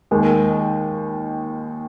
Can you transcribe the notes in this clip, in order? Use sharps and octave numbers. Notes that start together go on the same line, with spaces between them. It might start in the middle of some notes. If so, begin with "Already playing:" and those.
D#2 D#3 G#3